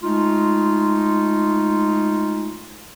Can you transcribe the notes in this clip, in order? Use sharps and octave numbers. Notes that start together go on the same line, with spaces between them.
G#3 A3 D#4 F4